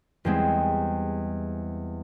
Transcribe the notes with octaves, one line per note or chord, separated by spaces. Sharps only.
E2 G3 G#3 C4